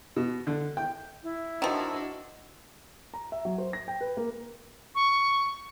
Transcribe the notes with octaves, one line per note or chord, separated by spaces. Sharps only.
B2
D3
G5
E4
D#3 F3 D4 F#4 D#5 E6
A#5
E5
F#3
C5
A#6
G5
B4
A#3
C#6